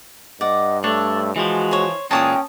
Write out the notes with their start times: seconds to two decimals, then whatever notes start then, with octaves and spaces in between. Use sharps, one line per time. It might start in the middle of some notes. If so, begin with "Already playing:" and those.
0.41 G2 D5 D#5 F#5
0.84 A3 D4 C#5
1.36 E3 F3 G#3 F#4
1.71 C5 C#5
2.11 A#2 E3 G#3 C#4 G5 A5 D6 D#6